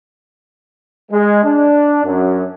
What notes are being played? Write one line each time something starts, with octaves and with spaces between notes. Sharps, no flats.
G#3
D4
F#2